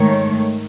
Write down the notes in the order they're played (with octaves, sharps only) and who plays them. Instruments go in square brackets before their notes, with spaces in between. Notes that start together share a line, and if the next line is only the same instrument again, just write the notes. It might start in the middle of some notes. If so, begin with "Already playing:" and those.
Already playing: [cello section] G#2 D#3 A3 C#5